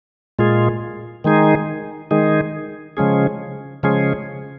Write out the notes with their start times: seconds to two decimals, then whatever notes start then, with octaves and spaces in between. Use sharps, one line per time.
0.39 A#2 G#3 F4 G#4
1.24 D#3 G#3 D#4 G#4
2.11 D#3 G#3 D#4 G#4
2.97 C#3 F3 G#3 C#4 G#4
3.83 C#3 F3 G#3 C#4 G#4